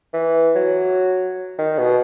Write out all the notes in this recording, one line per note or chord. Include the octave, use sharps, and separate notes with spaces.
E3
F#3
D#3
B2